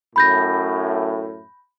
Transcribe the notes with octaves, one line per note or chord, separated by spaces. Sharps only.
F#2 A2 B5 G6 A#6